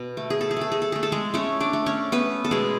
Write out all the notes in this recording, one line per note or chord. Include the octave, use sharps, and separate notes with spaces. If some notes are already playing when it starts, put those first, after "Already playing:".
Already playing: B2
A3
G#4
A4
G#4
A3 A4
G#4
A4
A3 G#4
A4
G#3 G#4
A3 C#4 C#5
D4 D5
A3
C#4 C#5
A3 B3 B4
A4
B2 G#3 G#4